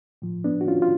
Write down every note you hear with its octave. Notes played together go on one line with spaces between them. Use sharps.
A2 F3
B3 D4
F#4
C#4 F4
F4